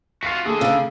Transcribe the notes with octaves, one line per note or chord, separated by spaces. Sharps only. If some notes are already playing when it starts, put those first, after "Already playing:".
F4 F#4 B6 C7
D3 A3 G#4
C#3